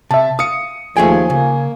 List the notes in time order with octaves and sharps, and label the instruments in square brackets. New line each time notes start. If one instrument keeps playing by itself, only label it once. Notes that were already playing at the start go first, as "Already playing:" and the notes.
[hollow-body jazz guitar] C3 [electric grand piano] E5 A5
[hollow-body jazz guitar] F5 [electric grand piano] D#6 C#7
[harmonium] D#2 F3 [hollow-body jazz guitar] A3 G#4 G5 [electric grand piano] G#5
[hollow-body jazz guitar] C#3 [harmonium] A#3